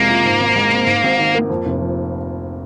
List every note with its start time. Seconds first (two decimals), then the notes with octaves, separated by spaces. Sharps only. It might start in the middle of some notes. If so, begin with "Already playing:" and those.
Already playing: F2 C3 G#3 A#3
0.10 F4
0.25 G#2
0.40 G#1
0.56 G#3
0.72 C4
0.87 G#2
1.04 G#1
1.19 D#3
1.35 A#3
1.50 F2
1.65 F1
1.81 F3